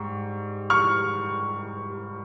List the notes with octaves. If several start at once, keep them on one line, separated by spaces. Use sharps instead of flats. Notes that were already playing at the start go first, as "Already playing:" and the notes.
Already playing: G#2 G3 C#6
C#6 F6